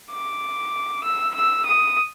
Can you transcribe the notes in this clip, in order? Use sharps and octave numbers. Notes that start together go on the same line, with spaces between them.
D6
E6
E6
D#6